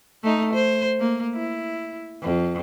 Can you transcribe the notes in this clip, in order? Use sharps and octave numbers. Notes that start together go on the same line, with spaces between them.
A3 D#4
C5
A#3
E4
F2